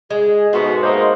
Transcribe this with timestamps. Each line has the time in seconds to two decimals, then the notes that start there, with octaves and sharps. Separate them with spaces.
0.10 G#3 G#4
0.53 G#2 B2 A3 F#4 C6
0.83 G#3 A#3 D#4 C5